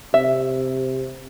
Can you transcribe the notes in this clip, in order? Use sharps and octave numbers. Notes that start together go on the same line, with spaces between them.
C3 E5